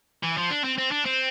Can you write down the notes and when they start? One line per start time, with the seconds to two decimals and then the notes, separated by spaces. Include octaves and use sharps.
0.23 E3
0.37 F3
0.50 D4
0.64 C4
0.78 C4
0.91 D4
1.05 C4